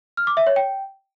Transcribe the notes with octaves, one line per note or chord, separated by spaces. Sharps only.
F6
D6
E5
C#5
G5